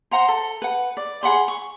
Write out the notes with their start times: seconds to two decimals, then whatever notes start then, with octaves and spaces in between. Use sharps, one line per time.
0.11 C5 F#5 A#5 C6
0.28 A4
0.62 B4 F#5
0.97 D5
1.23 G#4 F#5 B5 C6
1.48 C#6